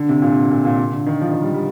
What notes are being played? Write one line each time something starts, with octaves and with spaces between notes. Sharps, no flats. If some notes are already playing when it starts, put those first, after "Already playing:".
Already playing: D3
C3
A#2
A#2
A#2
D3
D#3
F3
D#3
G3
G3